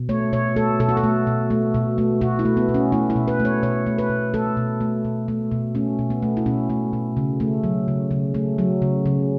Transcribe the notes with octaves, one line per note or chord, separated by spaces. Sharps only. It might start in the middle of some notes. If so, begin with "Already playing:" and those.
Already playing: B2
A3 C#5
B2 C#5
A3 A4
B2 A4
F#4
A4
A3
B2
A3
B2
A3
B2 F#4
E4
A3
B3
B2
C#4
A3 E4
E4
B2
B4
A3
C#5
B2 C#5
A3
B4
B2
A3 A4
B2
A3
B2
A3
B2
A3 C#4
B2
B3
A3
E4
B2 C#4
A3
B2
C#3
A3
F#3
C#3
C#3
A3
F#3
C#3
C#3